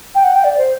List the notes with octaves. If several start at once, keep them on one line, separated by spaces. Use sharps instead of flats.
G5
F#5
G5
D5
C5